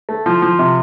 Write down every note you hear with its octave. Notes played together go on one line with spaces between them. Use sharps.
A3
F3
F3
C3